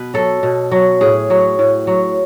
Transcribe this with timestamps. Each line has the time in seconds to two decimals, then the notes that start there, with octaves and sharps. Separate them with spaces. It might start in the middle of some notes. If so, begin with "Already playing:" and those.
Already playing: B2 B4
0.14 F#3 A4
0.43 B2
0.71 F#3
1.01 A2 G#4
1.30 F#3
1.59 A2
1.87 F#3